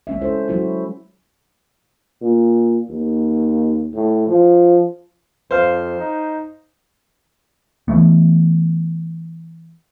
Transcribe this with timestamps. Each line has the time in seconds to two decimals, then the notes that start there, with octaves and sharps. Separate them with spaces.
0.07 G#3 C#4 E5
0.21 E4 A4 C5
0.48 F#3 E4 F#4 C5
2.22 A#2
2.90 D#2
3.94 A2
4.28 F3
5.51 F2 C5 F5
5.99 D#4
7.88 E3 A3 B3